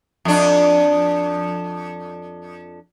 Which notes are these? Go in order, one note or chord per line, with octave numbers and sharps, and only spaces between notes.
F2 D4